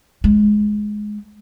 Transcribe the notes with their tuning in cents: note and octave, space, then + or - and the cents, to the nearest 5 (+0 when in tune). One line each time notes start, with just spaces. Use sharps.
G#3 +10